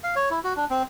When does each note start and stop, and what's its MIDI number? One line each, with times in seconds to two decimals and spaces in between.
0.04 0.15 77
0.16 0.29 73
0.31 0.40 64
0.44 0.53 66
0.56 0.65 62
0.70 0.83 60